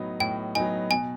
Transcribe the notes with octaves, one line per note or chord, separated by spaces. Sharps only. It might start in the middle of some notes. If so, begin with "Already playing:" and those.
Already playing: A2 F#3 B3 D#4
A2 G5
F#3 B3 D#4 G#5
B2 G#5